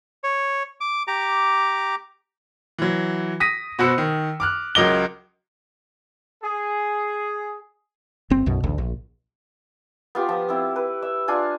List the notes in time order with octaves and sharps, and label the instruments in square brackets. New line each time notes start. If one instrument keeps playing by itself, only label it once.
[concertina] C#5
D6
G4 A#5 D6
[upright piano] E3 F#3
D#6 A#6 B6 D#7
B2 F#4 C5 B5 E6 C#7
D#3
D6 F6 F#6
C#2 F#3 A#4 D#5 D6 G7
[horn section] G#4
[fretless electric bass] G1 C4
B1 F#2 B2
A1 D2
A#1
[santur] B3 F4 G4
F3
C4 E4
B4
E5
D4 F4 G#5